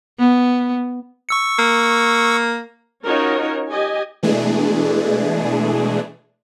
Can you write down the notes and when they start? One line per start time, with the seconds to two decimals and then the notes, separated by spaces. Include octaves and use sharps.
0.19 B3
1.29 C#6 E6 C#7
1.59 A#3
3.04 C#4 D#4 F4 F#4 A#4 C#5
3.70 G4 D#5 G#5
4.23 B2 E3 G#3 A3 D4 G#4